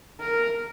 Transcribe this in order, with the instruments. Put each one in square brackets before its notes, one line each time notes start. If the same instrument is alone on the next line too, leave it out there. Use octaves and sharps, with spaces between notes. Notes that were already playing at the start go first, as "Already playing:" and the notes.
[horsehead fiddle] A#4